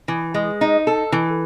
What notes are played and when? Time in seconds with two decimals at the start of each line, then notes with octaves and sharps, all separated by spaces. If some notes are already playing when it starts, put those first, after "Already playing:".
0.08 E3
0.34 G#3
0.61 D#4
0.87 A4
1.12 E3